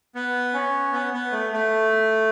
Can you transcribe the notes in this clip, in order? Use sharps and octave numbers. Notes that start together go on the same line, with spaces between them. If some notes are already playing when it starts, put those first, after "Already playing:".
B3
C#4
B3
B3
A3
A3